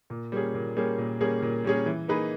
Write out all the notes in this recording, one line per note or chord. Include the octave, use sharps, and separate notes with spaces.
A#2
G3 A#3 C#4 G#4
A#2
G3 A#3 C#4 G#4
A#2
G3 A#3 C#4 G#4
A#2
G3 A#3 C#4 G#4
E3
A#3 D#4 G#4 B4